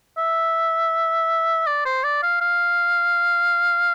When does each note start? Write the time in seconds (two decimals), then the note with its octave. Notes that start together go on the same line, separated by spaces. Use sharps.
0.18 E5
1.66 D5
1.85 C5
2.04 D5
2.23 F5
2.41 F5